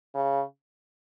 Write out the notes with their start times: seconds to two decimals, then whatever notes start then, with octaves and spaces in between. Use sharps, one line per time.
0.15 C#3